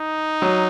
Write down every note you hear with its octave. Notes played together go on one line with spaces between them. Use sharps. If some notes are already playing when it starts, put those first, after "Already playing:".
Already playing: D#4
F#3